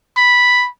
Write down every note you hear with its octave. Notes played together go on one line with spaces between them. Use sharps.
B5